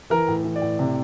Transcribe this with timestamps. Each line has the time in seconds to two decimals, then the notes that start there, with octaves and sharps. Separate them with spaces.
0.10 E3 A#4
0.28 A2
0.44 E3
0.56 D5
0.62 A2
0.79 C3